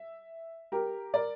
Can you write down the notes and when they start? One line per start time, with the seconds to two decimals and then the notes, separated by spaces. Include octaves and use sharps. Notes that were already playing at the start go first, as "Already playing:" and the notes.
Already playing: E5
0.72 G4 A#4
1.13 A#4 D5